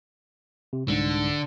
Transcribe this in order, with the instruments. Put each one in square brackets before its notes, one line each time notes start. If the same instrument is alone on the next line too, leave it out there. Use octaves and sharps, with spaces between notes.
[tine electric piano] C3
[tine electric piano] C2 G#2 [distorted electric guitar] D3